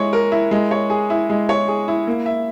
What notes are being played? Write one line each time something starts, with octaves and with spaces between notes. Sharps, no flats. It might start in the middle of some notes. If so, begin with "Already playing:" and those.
Already playing: G#3 E4 C#5
A#4
E4
G#3
C#5
G#4
E4
G#3
C#5
G#4
E4
A#3
E5